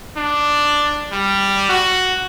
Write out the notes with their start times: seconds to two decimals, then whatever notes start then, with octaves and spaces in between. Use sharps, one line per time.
0.17 D4
1.12 G3
1.69 F#4